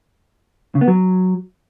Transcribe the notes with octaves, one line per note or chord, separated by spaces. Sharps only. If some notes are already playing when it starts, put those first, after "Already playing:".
C#3
B3
F#3